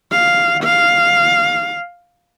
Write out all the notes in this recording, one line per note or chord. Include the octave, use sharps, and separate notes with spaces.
F5
F5